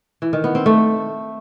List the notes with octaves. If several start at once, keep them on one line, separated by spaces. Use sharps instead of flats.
E3
D#3
B3
C4
A3